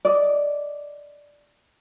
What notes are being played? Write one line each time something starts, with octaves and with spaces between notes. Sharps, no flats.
D5 D#5